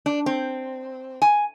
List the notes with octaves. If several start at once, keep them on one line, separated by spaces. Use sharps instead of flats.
D4
C4
G#5